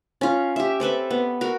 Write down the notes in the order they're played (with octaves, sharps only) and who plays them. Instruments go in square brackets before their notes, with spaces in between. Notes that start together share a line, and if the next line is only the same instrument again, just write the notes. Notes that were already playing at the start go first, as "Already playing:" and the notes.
[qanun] C#4 F4
G4 E5
C4 A4 B4 E5
B3
F#4 A#4